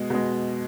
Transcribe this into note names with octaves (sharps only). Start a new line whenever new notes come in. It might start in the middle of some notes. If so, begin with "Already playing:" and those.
Already playing: B2 G#3
B2 G#3